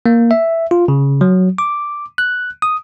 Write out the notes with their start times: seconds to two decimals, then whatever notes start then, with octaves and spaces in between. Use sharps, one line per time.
0.06 A#3
0.31 E5
0.71 F4
0.88 C#3
1.21 F#3
1.58 D6
2.18 F#6
2.62 D#6